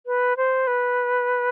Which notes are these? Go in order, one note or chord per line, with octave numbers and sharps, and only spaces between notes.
B4
C5
B4